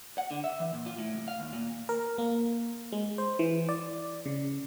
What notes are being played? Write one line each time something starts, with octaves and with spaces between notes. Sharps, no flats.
F#5
D3
E5
E3
A#2
F4
A2
C2
F5
D#2
A#2
A#4
A#3
G#3
C5
E3
D5
C#3